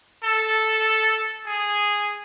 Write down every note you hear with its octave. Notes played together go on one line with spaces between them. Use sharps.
A4
G#4